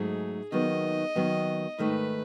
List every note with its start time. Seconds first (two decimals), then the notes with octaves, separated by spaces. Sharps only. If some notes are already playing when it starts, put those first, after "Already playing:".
Already playing: G#2 F#3 A3 D#4 G#4
0.52 D#2 D#3 F#3 B3 D#5
1.15 D#2 D#3 F#3 B3
1.78 G#2 D#3 A3 B4